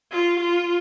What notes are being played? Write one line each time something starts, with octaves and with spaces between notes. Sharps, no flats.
F4
F4